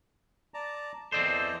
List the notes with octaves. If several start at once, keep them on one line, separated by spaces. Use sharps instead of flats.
D5 A5 A#5
E2 C4 A4 C5 D5 D#5